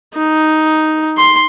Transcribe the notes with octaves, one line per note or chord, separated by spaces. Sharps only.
D#4
C6